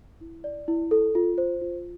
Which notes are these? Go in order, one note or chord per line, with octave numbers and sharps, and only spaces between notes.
E4
D5
E4
A4
F4
C5
F4